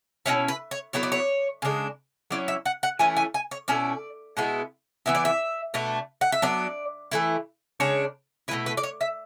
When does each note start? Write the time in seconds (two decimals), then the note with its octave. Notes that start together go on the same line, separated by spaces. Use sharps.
0.26 B2 G#3 C#4 E4 C#5
0.48 B4
0.71 C#5
0.93 F#3 B3 E4 C#5
1.03 D5
1.12 C#5
1.62 C#3 G#3 D4
2.31 F#3 C#4 E4 D5
2.48 E5
2.66 F#5
2.83 F#5
2.99 E3 A3 C#4 E4 G#5
3.17 G#5
3.34 G#5
3.51 C#5
3.68 B2 A3 C#4 E4 D5
4.37 B2 G#3 B3 E4
5.06 E3 B3 E4 E5
5.15 D5
5.25 E5
5.74 B2 A3 D4
6.21 F#5
6.32 E5
6.42 F#3 B3 D4 D5
7.11 E3 A3 E4
7.80 C#3 G#3 D4 C#5
8.48 E4 B4
8.51 B2 A3
8.66 B4
8.77 D5
8.83 C#5
9.01 E5